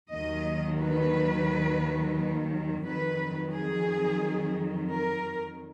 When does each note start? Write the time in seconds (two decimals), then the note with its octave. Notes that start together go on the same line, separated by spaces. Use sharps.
0.12 D#2 D#3 F#3 D#5
0.80 B4
2.85 F2 D#3 F#3 B4
3.53 G#4
4.90 A#4